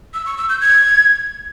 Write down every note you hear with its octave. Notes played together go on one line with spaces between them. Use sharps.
E6
C#6
E6
G6
G#6